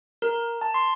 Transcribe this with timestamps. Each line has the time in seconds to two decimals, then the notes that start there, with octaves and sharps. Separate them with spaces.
0.22 A#4
0.61 A5
0.74 C6